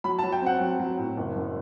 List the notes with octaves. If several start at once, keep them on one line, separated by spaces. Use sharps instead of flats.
F#3 B5
A5
F#3
G5
C4 F#5
F#3
F#3
A2
F#1
F#2